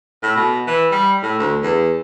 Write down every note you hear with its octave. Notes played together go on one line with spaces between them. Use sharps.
A2
B2
E3
G3
A2
D2
E2